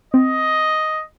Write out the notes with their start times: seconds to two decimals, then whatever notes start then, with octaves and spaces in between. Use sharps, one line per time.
0.14 C4 D#5